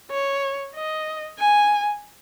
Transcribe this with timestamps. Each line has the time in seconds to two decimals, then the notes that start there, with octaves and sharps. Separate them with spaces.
0.11 C#5
0.75 D#5
1.39 G#5